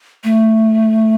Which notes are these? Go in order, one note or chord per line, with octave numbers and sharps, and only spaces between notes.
A3